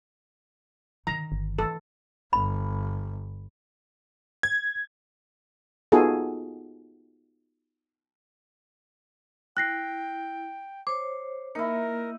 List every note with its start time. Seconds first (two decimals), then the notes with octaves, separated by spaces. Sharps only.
1.07 D3 D#3 A#5
1.32 G1
1.59 E3 A4
2.33 G1 B5
4.43 G#6
5.92 B3 D#4 F4 F#4 G#4 A4
9.57 E4 G5 F#6 A#6 C7
10.87 C5 C#5 D6
11.55 A#3 D#4 E4 A#4